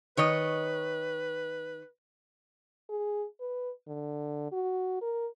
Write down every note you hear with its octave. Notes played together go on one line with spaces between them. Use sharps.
D#3 B4 C#5 D#5
G#4
B4
D3
F#4
A#4